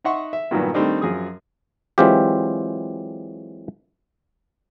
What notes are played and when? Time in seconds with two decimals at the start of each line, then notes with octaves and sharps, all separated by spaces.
0.05 D#4 E5 F#5 C6 C#6
0.33 E5
0.51 G2 A#2 D#3 F#3 B3
0.74 D#3 G3 A3 C4 D4 D#4
1.02 F#2 F3 G#4 D#6
1.98 E3 F#3 G#3 C4 F4 G4